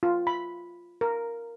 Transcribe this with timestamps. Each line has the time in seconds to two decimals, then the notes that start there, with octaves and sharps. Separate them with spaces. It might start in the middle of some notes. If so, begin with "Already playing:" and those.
0.03 F4
0.27 B5
1.01 A#4